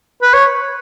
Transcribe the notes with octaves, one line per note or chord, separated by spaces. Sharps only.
B4
C#5